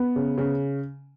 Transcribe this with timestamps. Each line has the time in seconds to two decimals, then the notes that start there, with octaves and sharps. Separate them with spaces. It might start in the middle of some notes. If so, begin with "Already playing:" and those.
Already playing: B3
0.16 C#3
0.38 C#3